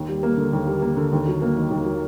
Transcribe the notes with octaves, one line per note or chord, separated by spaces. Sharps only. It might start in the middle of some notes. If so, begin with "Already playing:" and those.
Already playing: D#2
G3
A#3
D3
D#2
G3
A#3
D3
D#2
F#3
A#3
D#3
D#2
F#3